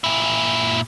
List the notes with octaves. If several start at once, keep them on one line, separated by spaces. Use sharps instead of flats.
A#2 E4